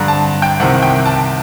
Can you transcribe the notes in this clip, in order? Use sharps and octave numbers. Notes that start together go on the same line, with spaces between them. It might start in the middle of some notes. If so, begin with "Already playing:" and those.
Already playing: G2 D3 A#5
A5
G5
C2 C3 D#3 F#5
G5
A5